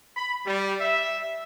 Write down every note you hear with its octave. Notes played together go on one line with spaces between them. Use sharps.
B5
G3
E5